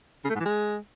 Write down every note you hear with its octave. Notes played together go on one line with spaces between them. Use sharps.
C#3
A3
G#2
E3
G#3